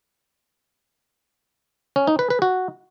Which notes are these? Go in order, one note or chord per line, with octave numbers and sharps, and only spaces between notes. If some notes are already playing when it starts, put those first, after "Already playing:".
C#4
D#4
B4
B4
F#4